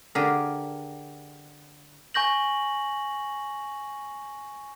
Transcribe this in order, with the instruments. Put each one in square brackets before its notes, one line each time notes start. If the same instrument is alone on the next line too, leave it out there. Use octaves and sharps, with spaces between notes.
[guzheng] D3 G4 G#4 A#4
[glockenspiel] G#5 C#6 G6 A#6 F#7